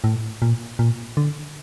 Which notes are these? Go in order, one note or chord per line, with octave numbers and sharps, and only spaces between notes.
A2
A#2
A#2
D3